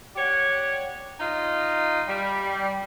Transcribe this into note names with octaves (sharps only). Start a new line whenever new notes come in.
G4 C#5 D5 F#5
D#4 F4 D#5
G3